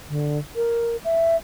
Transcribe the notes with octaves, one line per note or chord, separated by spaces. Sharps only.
D3
A#4
E5